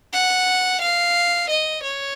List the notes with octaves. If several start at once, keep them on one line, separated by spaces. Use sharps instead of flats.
F#5
F5
D#5
C#5